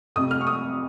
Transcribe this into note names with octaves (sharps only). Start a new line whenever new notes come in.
F1 F2 C3 D#6
F6
C#6
D#6